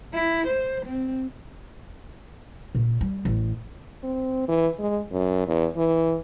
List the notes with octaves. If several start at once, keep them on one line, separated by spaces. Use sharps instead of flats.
E4
C5
C4
A#2
G3
A1
C4
E3
G#3
F#2
E2
E3